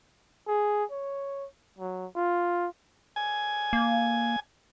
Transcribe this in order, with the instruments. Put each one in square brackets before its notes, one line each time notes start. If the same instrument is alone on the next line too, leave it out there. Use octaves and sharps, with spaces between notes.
[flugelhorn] G#4
C#5
F#3
F4
[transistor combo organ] G#5
[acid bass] A#3